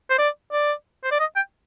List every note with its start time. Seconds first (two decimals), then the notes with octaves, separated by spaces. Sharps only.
0.10 C5
0.18 D5
0.52 D5
1.04 C5
1.11 D5
1.20 D#5
1.36 G5